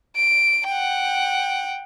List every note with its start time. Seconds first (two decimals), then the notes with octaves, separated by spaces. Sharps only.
0.16 D7
0.67 F#5 G5